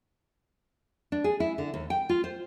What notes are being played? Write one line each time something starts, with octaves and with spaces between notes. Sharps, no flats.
D4
G#4
E4
D3
D#2
G5
F4
C5